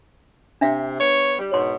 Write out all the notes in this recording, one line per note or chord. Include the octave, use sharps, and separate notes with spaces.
C3 D4 E5 F5
B3 C#5
G3
G#2 B2 C#5 C6